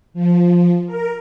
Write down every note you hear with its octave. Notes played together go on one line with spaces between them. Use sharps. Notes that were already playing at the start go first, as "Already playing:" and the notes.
F3
A#4